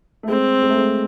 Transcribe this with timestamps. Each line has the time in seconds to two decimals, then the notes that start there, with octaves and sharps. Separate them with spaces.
0.23 A3
0.29 G#3 C4
0.63 G#3
0.69 A3
0.77 G#3